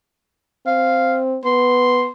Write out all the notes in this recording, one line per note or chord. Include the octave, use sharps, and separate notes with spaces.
C4 F5
B3 C6